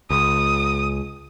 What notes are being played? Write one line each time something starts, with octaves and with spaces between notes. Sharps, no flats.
C#2 D#6